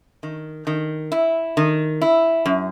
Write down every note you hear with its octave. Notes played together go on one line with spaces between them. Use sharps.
D#3
D#3
E4
D#3
E4
F#2